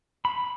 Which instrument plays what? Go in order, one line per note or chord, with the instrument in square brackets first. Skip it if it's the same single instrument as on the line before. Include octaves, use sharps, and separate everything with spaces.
[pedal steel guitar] B5